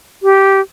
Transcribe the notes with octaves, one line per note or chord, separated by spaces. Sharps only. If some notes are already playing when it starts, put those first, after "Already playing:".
G4